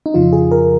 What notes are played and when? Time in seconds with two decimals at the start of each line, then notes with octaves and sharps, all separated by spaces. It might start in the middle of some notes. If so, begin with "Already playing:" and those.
0.06 D#4
0.14 F2 C#3 F3 F4
0.33 G#4
0.51 A#4